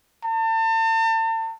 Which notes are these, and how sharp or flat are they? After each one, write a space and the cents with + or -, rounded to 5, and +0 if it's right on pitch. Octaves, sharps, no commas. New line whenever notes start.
A5 +40